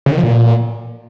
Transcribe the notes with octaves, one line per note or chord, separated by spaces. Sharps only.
C#3
D#3
F3
A#2